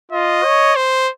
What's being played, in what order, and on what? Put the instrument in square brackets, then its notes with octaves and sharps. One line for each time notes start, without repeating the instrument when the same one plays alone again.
[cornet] F4 [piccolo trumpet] D#5
[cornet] C#5
[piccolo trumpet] C5